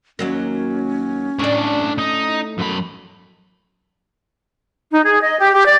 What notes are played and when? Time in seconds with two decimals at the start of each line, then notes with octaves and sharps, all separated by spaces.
0.19 D#2 F#3 A#3 C#4
1.39 A2 D4 C#5 D5
1.98 D#4
2.58 F#2 B5
4.91 D#4
5.04 G#4
5.22 D#5
5.39 G4
5.53 G4
5.66 D5